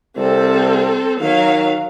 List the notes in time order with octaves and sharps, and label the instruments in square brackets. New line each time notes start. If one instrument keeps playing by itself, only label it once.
[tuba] C2 [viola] C4 A4
[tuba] D#3 [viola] F#3 F5